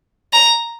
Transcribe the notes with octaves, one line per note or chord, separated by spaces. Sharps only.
A#5